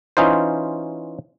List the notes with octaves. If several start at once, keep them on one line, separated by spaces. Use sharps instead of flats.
E3 C#4 D#4 F4 C5